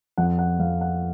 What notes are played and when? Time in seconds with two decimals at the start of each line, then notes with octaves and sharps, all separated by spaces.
0.18 F2 F#5
0.39 F#5
0.60 F2 F5
0.81 F#5